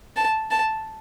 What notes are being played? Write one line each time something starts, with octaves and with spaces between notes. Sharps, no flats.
A5
A5